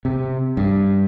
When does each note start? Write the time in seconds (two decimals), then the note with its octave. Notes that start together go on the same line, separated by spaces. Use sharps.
0.05 C3
0.57 G2